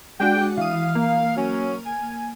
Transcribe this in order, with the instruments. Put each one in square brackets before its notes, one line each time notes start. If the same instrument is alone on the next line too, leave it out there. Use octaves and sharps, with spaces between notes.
[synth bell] G#3 D4 F#4 [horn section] G5
[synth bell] E3 D#6 [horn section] F5
[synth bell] A#3
[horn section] F#3 C#4
G#5